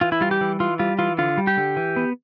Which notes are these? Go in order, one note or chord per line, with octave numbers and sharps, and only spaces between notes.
E3 F4
E4
G3 F4
G4
E3
E3 F4
G3 F4
E3 F4
D3 F4
G3
G4
D3
E3
B3